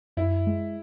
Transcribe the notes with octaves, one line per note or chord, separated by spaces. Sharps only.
F#2 E4
G#3